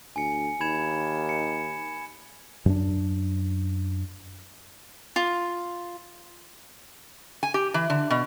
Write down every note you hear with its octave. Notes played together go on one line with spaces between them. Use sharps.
D2 G#5 C#7
D#2 B5 G#6 E7
C#7
F#2 D4
F4
G#5
G4
E3
D3
B2